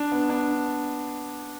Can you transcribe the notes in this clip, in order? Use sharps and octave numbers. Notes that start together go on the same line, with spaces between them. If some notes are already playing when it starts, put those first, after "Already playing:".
Already playing: D4
B3
D4